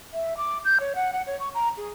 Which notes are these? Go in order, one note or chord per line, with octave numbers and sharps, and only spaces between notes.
E5
D6
G6
C#5
F#5
F#5
C#5
C#6
A#5
G#4